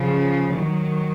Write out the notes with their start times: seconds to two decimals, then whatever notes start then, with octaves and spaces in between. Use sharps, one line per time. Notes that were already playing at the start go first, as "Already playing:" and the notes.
Already playing: C#3 F3
0.53 D#3 F#3